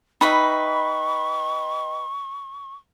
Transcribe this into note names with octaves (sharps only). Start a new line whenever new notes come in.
D#4 B4 D#5 E5 G5 B5 C#6